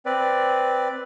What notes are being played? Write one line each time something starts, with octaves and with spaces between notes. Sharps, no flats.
C4 B4 D5